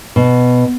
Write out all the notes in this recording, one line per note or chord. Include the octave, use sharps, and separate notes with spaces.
B2